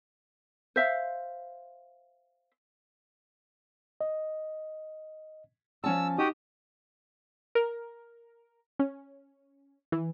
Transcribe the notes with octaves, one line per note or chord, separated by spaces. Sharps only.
C5 E5 F5
D#5
F3 C#4 A5 E6
D#4 F#4 G4 D#6
A#4
C#4
E3